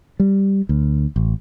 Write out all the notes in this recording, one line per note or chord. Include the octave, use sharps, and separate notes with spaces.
G3
D2
A1